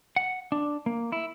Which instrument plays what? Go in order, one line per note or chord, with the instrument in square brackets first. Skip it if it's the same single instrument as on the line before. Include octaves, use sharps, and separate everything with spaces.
[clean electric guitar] F#5
D4
A#3
E4